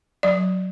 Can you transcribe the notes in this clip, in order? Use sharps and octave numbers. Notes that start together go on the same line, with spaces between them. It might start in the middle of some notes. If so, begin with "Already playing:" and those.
F#3 D5